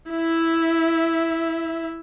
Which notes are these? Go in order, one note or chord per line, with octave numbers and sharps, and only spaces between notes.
E4 E5